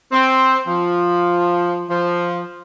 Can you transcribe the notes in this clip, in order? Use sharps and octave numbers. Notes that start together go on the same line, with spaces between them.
C4
F3
F3